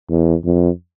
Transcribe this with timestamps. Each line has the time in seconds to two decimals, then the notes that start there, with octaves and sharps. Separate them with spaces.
0.10 E2
0.45 F2